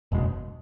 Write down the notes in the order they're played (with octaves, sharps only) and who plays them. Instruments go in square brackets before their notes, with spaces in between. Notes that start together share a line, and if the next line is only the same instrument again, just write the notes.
[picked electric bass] F#1 E2 B2 G#3